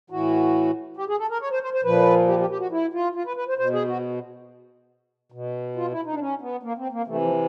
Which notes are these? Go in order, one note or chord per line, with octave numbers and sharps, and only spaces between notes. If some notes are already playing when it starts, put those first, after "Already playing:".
A2 E3 F#4
G4
G#4
A4
A#4
C#5
C5
C5
C5
A#2 F3 B4
G4
G4
G4
F#4
E4
F4
F4
B4
B4
C5
B2 C5
G#4
F#4
B2
F4
E4
D#4
D4
C#4
B3
A#3
C4
A#3
C3 E3 A3
F3